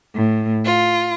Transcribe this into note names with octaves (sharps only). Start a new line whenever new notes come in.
A2
F4